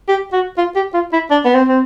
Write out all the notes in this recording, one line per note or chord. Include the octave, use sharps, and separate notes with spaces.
G4
F#4
F4
G4
F4
E4
D4
B3
C4
C4